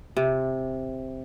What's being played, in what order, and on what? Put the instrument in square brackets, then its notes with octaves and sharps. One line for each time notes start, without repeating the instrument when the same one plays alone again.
[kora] C3